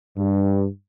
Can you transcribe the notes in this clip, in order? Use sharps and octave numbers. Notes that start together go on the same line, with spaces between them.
G2